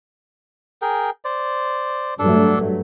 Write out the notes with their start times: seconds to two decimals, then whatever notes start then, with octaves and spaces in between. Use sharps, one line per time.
0.82 G#4 A#4 G5
1.25 C5 D5
2.19 G2 F#3 A3 D4 A4